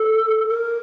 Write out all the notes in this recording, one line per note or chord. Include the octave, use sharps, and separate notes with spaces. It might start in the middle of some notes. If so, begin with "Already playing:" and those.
Already playing: A4
A#4